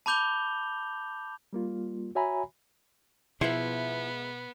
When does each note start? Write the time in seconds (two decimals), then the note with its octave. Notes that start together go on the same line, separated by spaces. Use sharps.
0.06 A5 B5 D6 G6 F7 G7
1.53 G3 A#3 F4
2.15 F#4 C#5 E5 G#5 A#5 B5
3.41 B2 F3 G#3 A#3 B3 E4 E5